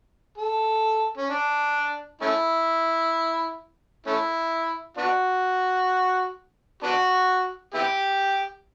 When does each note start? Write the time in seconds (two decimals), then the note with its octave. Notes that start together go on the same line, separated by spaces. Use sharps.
0.38 A4
1.17 C#4
1.30 D4
2.21 A3 C#4 E4
4.06 A3 C#4 E4
4.97 B3 D4 F#4
6.83 B3 D4 F#4
7.74 B3 E4 G4